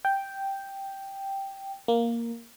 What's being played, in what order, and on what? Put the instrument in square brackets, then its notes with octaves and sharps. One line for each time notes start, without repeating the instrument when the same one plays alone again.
[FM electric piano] G5
A#3